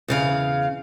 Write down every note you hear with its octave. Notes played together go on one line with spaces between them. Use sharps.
E2 C#3 F5